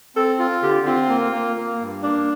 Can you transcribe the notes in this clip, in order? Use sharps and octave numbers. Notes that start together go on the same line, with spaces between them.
C4 A4
F4
D3 G4
C4 F4
A#3
A#3
A#3
G2
A#3 D4